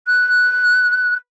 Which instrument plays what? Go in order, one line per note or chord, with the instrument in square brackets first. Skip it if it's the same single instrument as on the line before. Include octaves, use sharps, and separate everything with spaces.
[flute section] F#6